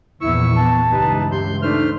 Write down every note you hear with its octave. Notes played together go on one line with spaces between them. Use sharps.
A#1 E2 E4 C#6 E6
B3 A5
C#2 G2 E3 D#4 G4 B4
G4 C6 G6
A3 D4 D#4 C5 F6